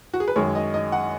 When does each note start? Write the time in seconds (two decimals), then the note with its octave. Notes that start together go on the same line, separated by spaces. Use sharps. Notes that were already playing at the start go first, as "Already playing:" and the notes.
0.14 F#4
0.20 G#4
0.28 B4
0.36 F#2 D#3 G#3 C#5
0.55 D#5
0.74 D#5
0.92 F#5